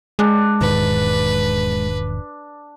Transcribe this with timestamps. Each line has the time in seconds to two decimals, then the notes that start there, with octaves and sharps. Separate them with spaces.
0.19 G#3 D4
0.61 E1 G#2 D#3 B4